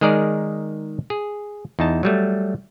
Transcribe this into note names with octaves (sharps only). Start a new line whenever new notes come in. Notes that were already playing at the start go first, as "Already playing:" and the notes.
D#3 G#3 G#4 A#4 D5
G#4
E2 D#4 A5
F#3 G3 A3